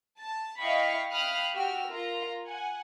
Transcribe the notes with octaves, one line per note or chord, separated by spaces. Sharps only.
A5
E4 D#5 F5 G5 B5 C#6
F5 G5 B5 D#6 F6 F#6
F#4 G4 G5 E6 F6
F4 A#4 A#5
F#5 G#5